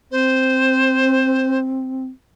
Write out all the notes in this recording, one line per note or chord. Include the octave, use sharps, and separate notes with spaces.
C4 C5